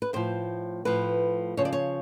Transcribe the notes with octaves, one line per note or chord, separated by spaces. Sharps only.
B4
A2 F3 C5
A2 F3 B4
C#3 F3 C#5
D5
C#5